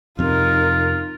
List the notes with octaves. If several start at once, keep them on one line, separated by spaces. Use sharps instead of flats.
F2 C3 D#4 F4 A#4